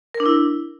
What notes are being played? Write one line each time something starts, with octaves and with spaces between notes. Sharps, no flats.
A#4
D4
E4